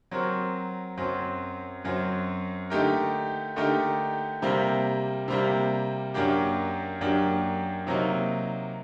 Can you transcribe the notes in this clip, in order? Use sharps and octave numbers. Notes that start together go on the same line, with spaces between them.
F#3 C4 F#4 A#4
F#2 F#3 C4
F#2 F#3 C4
D3 A3 D#4 G4 A#4
D3 A3 D#4 G4 A#4
C3 G3 A#3
C3 G3 A#3
F#2 F#3 A#3 D4 G4
F#2 F#3 A#3 D4 G4
C3 F#3 A#3 D#4